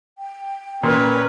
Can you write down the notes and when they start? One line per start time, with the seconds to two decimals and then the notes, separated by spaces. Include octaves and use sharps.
0.18 G5
0.83 A#2 C#4 A#4 B4